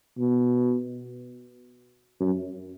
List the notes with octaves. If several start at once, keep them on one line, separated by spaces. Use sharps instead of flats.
B2
F#2